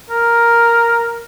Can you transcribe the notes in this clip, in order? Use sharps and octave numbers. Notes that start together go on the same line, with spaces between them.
A#4